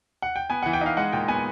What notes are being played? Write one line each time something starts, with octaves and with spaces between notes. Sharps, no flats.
F#5
G5
B3 G#5
E3 F#5
G5
D#4 F5
G#3 F#5
A#2 G5
B3 G#5